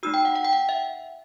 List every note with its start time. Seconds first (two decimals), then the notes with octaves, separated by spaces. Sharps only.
0.03 A3 D#4 F#4 E6
0.14 G5
0.25 F#5
0.36 F#5
0.45 G5
0.53 F#5
0.69 E5